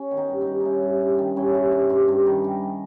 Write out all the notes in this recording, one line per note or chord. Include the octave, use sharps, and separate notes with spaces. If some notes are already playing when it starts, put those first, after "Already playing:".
Already playing: C#4
D#3
B3 D#4
G2
B3 D#4
G2
G2 C#4 D#4 E4
G2
G2
D#3
G2 C#4 E4
G2
G2
G2
G2
D#3
D#3